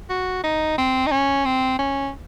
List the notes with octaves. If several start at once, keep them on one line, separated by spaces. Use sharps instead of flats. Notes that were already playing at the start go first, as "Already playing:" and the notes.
F#4
D#4
C4
D#4
C#4
C4
C#4